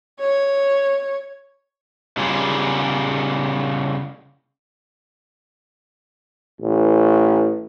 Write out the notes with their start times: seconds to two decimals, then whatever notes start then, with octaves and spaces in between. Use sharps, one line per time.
0.20 C#5
2.17 C#3 G3 A#3 F4 G#4
6.61 A1